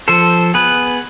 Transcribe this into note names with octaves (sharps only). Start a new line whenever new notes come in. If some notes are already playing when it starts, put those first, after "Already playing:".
F3 A4 C5
B3 G#4 B4